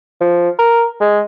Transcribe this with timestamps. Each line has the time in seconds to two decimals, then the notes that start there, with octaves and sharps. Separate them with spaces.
0.21 F3
0.59 A#4
1.01 G#3